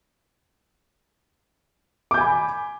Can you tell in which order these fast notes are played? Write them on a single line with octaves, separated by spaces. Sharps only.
D6 G6 G#5 B5